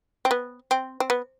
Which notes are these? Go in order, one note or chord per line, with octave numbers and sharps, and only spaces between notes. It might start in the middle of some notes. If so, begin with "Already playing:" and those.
C4
B3
C4
C4
B3